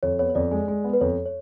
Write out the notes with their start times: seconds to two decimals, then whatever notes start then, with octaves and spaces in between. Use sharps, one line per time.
0.03 F2 C#5
0.19 B3 C#5
0.30 C#5
0.35 F2 D5
0.51 G#3
0.68 G#3
0.84 B3
0.93 B4
1.01 F2 C#5
1.26 C#5